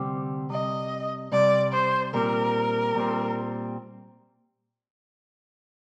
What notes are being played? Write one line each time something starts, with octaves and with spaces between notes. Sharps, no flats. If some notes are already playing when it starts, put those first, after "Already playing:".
Already playing: D2 C3 G3 C4 G4
C2 C3 G3 D#5
C2 C3 G3 D5
C5
A#2 G3 C4 A#4
A#2 G3 C4